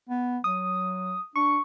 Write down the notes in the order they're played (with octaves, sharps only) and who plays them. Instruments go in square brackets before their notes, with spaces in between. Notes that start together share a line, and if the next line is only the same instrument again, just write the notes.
[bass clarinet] B3
[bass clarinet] F#3 [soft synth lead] D#6
[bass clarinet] D4 [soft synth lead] C#6